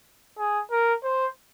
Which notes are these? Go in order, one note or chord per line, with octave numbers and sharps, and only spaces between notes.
G#4
A#4
C5